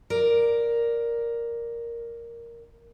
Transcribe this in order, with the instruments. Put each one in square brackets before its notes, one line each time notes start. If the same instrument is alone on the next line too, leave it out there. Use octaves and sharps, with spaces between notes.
[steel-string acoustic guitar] A#4 D5